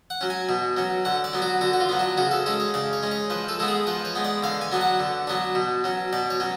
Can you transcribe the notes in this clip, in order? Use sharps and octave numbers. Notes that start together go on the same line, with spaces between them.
F#5
F#3 C#4
G#5
B2
F#3 C#4
D3 F#5
D5
F#3 B3
F#4
D3 F#4
F#4
F4
F#3 B3
D4
C#3 F#4
A4
G#3 C#4 A4
C#5
C#3 D5
C#5
G#3 C#4
C#5
F3 B4
A4
G#3 B3 A4
G#4
F3 B4
C#5
G#3 B3
D5
D3 F5
G#5
F#3 B3 D4
F#5
D3
F#3 B3 D4
B2
F#3 C#4
B2 D5
C#5
F#3 C#4